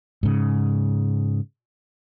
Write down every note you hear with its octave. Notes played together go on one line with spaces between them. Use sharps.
G#2 C#3